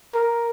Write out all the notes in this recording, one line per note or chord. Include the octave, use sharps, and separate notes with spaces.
A#4